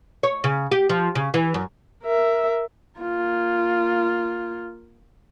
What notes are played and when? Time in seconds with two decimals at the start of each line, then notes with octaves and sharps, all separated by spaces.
0.23 C#5
0.44 C#3
0.71 G4
0.90 F3
1.15 C#3
1.34 E3
1.54 F#2
2.03 A#4 E5
2.99 A#3 F4